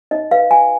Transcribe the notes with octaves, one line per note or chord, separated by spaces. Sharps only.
D#4 D#5
B4 F5
F#4 G#5